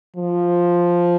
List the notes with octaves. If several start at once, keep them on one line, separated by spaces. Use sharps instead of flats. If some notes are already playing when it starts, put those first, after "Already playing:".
F3